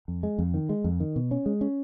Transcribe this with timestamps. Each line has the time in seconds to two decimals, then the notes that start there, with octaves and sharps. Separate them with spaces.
0.08 F2
0.23 G#3
0.39 F2
0.54 D#3
0.69 G#3
0.84 F2
1.00 D#3
1.16 B2
1.31 C#4
1.46 G#3
1.61 C#4